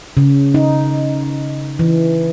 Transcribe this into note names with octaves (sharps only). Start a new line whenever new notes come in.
C#3
D#4
E3